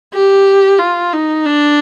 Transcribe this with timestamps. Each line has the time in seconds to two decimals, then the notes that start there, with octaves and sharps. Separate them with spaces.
0.14 G4
0.79 F4
1.13 D#4
1.46 D4